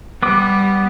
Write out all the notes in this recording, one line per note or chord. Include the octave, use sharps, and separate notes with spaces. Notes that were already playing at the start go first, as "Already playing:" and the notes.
G3 B3 D6